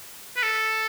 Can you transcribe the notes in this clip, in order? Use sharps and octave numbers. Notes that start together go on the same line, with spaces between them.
B4
A4